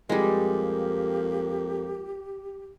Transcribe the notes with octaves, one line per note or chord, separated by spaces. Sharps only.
F2 G3 G#3 A#3 G4